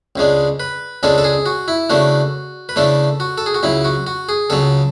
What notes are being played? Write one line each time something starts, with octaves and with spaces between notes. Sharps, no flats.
C#2 C#3 G#3 D4
B4
C#2 C#3 G#3 D4 A4
A4
G#4
F#4
E4
C#3 E3 A3 D4 F#4
B4
C#3 E3 A3 D4 A4
F#4
A4
G#4
F#4
C#2 C#3 F#3 E4
F#4
F#4
G#4
C#2 C#3 F#3 A4